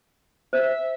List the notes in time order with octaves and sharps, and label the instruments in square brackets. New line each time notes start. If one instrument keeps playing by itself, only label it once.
[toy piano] C5 [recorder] E5